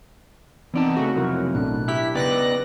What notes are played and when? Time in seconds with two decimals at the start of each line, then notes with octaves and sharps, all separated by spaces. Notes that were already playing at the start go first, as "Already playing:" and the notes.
0.74 E3 B3 C4 D#4 D5 A5
0.96 C#3 A3 F#4
1.16 C3 F3 F#3 E4 A#4
1.55 A1 B2 D4 F#6
1.88 E4 G4 B6
2.15 C#3 B3 D#4 B4 D5 G5 F#6 A#6